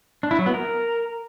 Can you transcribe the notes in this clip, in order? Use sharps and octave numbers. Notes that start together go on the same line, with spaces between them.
D4
E4
F#3
B3
A#4